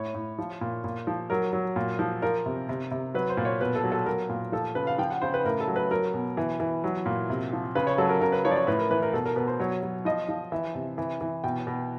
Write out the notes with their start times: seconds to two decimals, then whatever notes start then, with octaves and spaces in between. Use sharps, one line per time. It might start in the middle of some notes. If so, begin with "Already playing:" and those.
Already playing: A2 C#5
0.14 A2
0.38 F3
0.61 A#2
0.84 A#2
1.07 F3
1.30 F#3 A#4
1.53 F#3
1.76 A#2
1.99 F3
2.22 F3 A#4
2.46 C3
2.69 C3
2.91 C3
3.14 F#3 B4
3.29 C5
3.37 A#2
3.45 C#5
3.61 B2 B4
3.76 A4
3.84 F#3
3.92 A4
4.06 F#3 A#4
4.29 A#2
4.52 F3 A4
4.75 C#3 B4
4.87 F5
4.98 F3 G5
5.10 F#5
5.22 C#3 C5
5.34 B4
5.44 A2 A#4
5.60 A4
5.67 F#3
5.76 B4
5.91 F#3 A#4
6.14 B2
6.37 E3
6.60 E3
6.84 F#3
7.06 A#2
7.30 C3
7.53 F3
7.75 C#3 B4
7.87 C#5
7.98 F#3 A4
8.09 A#4
8.21 C#3 A#4
8.32 B4
8.45 F3 C#5
8.51 D5
8.56 C#5
8.67 A2 B4
8.79 A#4
8.91 E3 B4
9.02 A#4
9.13 B2 A4
9.26 A#4
9.36 B2 B4
9.47 C5
9.60 F#3 C#5
9.83 F#3
10.05 F3 D#5
10.28 F3
10.52 E3 E5
10.75 C3
10.98 E3
11.21 E3
11.44 B2 G5
11.67 B2